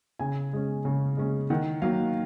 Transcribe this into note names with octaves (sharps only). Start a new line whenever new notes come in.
C#3 G#5
G#3 C#4
C#3
G#3 C#4
D#3 F#5
F#3 A#3 F5